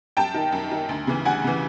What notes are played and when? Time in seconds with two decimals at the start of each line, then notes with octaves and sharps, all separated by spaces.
0.17 F#2 G5 A5
0.34 D#3
0.52 F#2
0.71 D#3
0.89 D2
1.07 C#3 E3
1.25 D2 F#5 G#5
1.44 C#3 E3